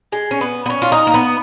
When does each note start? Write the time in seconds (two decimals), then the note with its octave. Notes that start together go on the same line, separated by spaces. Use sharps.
0.12 G#3
0.31 C#4
0.41 B3
0.66 B3
0.70 C#4
0.82 F4
0.92 D#4
1.07 A#3
1.14 B3